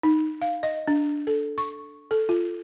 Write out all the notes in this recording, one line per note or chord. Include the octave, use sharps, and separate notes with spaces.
D#4
F5
D#5
D4
A4
C#6
A4
F4